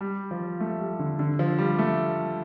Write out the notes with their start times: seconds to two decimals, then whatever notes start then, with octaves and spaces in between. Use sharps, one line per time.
0.01 G3
0.31 F3
0.60 A3
0.80 G3
0.99 D3
1.19 D3
1.39 F3
1.59 G3
1.79 A3